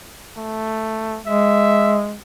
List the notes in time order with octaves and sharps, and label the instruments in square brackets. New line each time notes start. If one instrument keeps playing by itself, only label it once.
[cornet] A3
[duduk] G#3 [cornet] E5